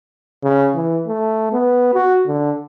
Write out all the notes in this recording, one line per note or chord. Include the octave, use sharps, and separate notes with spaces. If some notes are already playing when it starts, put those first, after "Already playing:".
C#3
E3
A3
B3
F#4
D3